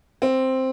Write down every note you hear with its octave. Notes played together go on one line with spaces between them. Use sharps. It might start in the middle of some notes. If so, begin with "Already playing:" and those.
C4